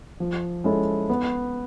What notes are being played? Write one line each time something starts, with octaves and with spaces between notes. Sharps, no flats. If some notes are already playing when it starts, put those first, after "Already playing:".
F3
G#3 C#4 E4 A4
B3